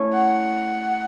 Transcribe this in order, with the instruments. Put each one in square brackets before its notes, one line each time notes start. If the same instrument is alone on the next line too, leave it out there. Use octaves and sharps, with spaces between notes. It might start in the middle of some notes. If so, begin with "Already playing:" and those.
Already playing: [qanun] A3 C#4 E4 A4
[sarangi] F#5